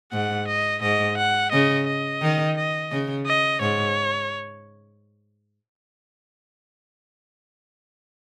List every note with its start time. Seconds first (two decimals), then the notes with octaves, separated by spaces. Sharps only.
0.12 G#2 F#5
0.48 D#5
0.82 G#2 D#5
1.17 F#5
1.52 C#3 D#5
1.87 D#5
2.21 D#3
2.57 D#5
2.92 C#3
3.26 D#5
3.61 G#2 C#5